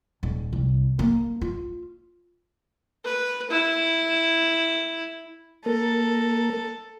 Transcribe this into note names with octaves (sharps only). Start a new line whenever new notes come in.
D#1
C2
A#3
F4
B4
E4
A#3 A4 A#4